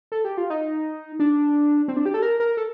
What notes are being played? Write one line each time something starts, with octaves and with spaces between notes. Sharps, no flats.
A4
G4
F4
D#4
D4
C4
D4
G4
A4
A#4
A#4
A4